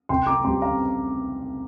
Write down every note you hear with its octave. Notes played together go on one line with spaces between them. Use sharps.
C2 G5 C6
A#5 D6
C3 G3 G5 C6
F5 A#5